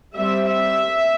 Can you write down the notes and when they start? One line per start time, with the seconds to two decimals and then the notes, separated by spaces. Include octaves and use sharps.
0.15 G3 C4 E5
0.50 E5